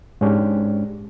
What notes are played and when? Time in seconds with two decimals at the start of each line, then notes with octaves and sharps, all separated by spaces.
0.21 G#2 G#3 C#4 D4 G4